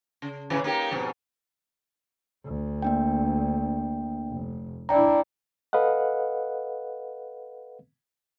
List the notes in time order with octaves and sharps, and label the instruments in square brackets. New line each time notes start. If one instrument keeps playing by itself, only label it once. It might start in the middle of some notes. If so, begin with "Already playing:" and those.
[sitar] C#3
A2 C#3 E3
A#3 D#4 G4
F2 G#2 B2
[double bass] D2
[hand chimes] A#3 D4 G5
[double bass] F1
[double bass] D4 E4 [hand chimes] D5 G5 A#5
[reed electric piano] A4 B4 D#5 F5 F#5